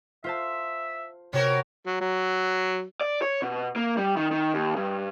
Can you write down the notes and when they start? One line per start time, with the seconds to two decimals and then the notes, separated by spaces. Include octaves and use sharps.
0.24 F4 C5 E5 A5
1.33 C3 B3 F#4 A#4 C#5
1.87 F#3
2.01 F#3
3.01 D5
3.22 C#5
3.42 B2
3.76 A#3
3.97 G3
4.17 D#3
4.31 D#3
4.54 D#2
4.76 G2